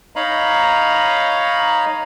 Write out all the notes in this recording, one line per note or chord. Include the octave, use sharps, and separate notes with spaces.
D#4 C#5 D#5 F5 A#5 B5